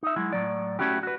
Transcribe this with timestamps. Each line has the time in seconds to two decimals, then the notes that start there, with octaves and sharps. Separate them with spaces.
0.03 D#4 E5
0.16 F#3 G#3 E4
0.33 A2 F#3 D5
0.79 A3 A#3 C#4 E4 F#4 G4
1.03 F#4 B4